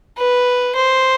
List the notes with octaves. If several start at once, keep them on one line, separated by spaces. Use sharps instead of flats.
B4
C5